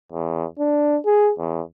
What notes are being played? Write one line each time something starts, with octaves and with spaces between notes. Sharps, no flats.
E2
D4
G#4
E2